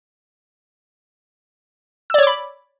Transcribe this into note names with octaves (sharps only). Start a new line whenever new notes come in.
C#5 D5 B5 D6 E6